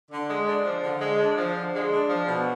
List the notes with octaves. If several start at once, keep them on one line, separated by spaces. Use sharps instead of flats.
D3
G#3
D4
F3
D3
G#3
D4
F3
D3
G#3
D4
F3
B2